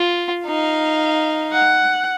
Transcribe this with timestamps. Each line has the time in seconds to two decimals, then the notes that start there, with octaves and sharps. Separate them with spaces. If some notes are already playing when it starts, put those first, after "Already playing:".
Already playing: F4
0.46 D#4 F5
1.51 F#5